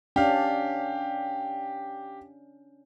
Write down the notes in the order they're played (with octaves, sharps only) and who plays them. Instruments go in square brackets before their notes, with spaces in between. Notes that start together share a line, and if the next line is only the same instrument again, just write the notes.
[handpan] C#4 D4 [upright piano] G4 F5